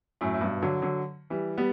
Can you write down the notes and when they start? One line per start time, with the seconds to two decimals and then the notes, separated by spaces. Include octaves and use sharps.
0.21 F#2 A2
0.34 A2
0.41 G2 B2
0.62 D3 F#3
0.82 D3 F#3
1.30 E3 G3
1.57 G3 B3